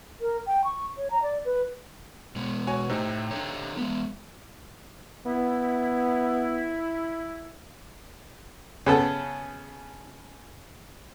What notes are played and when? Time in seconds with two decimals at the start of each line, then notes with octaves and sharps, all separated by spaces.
0.21 A#4
0.47 G5
0.64 C#6
0.97 C#5
1.11 A#5
1.23 D5
1.45 B4
2.36 B2 G#3 B3
2.67 F#4 C#5 G#5
2.90 A2 C3 C4 D#4
3.31 D4 A4 C#5
3.77 G#3 B3
5.26 B3 E4
8.86 C#3 B3 A4